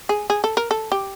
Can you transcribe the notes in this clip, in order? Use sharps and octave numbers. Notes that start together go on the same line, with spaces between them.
G#4
G#4
A4
A#4
A4
G4